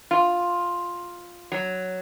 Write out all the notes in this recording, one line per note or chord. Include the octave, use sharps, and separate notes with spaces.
F4
F#3